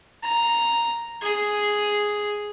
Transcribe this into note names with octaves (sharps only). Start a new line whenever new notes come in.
A#5
G#4